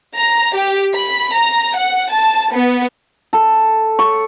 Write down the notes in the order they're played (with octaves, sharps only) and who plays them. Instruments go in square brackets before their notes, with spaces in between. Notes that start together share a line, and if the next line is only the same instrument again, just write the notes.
[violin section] A#5
G4
B5
A#5
F#5
A5
B3
[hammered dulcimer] A4
C#6